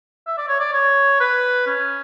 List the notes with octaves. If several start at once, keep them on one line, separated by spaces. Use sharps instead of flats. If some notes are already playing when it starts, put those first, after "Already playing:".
E5
D5
C#5
D5
C#5
B4
C#4